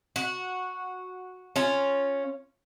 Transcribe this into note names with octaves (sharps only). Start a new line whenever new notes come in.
F#4
C#4 F4